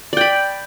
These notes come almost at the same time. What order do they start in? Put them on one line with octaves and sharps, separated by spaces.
D5 G5 B5